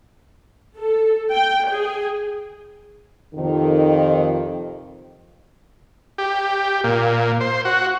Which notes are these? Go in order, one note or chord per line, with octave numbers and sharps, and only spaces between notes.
A4
G5
G#4
F2 C3 D#3
G4
A#2
C5
F#4